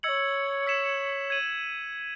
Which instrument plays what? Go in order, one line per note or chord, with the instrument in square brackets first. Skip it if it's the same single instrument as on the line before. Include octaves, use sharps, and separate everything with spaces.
[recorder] C#5 D#5 [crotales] E6 G#6 C#7 F#7
[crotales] E6 B6 E7
G#6 D#7 F#7